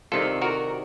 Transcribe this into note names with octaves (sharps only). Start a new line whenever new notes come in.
C2 C3 D#3 F4 A4
F#4 A#4